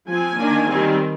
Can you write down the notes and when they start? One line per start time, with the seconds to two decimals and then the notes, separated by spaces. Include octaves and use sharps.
0.09 F3 C4 G#5
0.39 D#3 A#3 D4
0.70 D#3 G3 C4